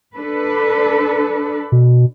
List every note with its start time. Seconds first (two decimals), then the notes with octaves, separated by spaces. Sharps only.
0.15 D4 A4 B4
1.72 B2